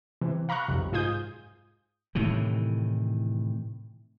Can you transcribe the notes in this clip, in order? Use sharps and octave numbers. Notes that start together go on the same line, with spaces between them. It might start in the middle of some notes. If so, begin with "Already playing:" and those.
C3 E3
F5 A#5 B5 C#6 F#6
B1 F2 C3
G#2 F4 G#4 D#6 G6
A2 C3 D#3 E3